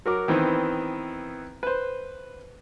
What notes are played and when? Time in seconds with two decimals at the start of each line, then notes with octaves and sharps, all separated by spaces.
0.06 F#3 A#4 D6
0.28 D#3 E3 B3 C4
1.63 B4 C5